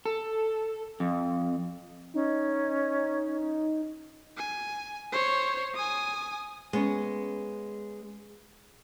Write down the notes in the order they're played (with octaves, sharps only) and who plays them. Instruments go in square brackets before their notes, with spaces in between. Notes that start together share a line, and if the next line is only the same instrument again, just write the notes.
[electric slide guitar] A4
F2
[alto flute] C#4 [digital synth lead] D#4
[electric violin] G#5
C5 C#5
G#5 D#6
[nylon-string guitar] G#3 B3 C#4